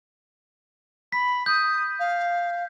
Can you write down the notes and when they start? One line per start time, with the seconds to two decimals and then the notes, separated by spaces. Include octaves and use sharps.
1.12 B5 B6
1.46 D#6 G6
1.99 F5